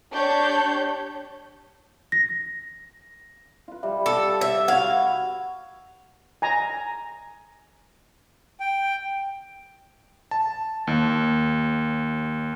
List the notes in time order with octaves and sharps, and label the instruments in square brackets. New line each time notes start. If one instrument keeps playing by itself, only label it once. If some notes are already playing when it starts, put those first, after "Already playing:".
[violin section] D4 G4 C#5 G6
[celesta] A#6
[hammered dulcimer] F4 B4
[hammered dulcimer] G3 [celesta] E5
[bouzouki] A4 [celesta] D6
[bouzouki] E5
[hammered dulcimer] F#4 B4 [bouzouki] F5 [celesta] F#5 G#6
[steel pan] G#5 A#5
[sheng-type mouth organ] G5
[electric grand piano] A5
D#2